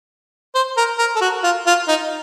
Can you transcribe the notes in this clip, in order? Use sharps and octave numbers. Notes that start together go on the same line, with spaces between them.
C5
A#4
A#4
A4
F#4
F4
F4
D#4